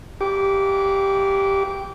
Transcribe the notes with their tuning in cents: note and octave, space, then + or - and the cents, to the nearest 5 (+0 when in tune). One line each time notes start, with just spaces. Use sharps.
G4 +0 D6 -20